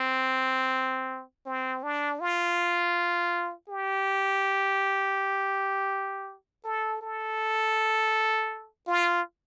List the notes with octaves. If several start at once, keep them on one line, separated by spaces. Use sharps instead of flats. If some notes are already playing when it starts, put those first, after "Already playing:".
Already playing: C4
C4
D4
F4
G4
A4
A4
F4